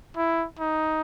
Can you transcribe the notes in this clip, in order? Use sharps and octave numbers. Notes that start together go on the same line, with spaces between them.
E4
D#4